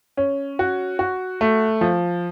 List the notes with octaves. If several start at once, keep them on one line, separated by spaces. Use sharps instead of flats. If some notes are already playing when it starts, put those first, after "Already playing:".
C#4
F#4
F#4
A3
F3